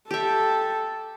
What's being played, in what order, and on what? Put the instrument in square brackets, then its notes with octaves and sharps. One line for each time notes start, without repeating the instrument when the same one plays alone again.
[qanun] G4 E5 [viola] A4